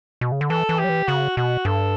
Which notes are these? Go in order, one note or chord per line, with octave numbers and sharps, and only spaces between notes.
B2
C#3
D3
E3 A4
E3
G4
F#3
E3
C#3 F#4
B2 F#4
G2 A4